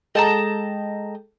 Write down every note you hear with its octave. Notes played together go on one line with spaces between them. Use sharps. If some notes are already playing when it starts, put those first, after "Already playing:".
G#3 A4 D#5 G5 A5 A#5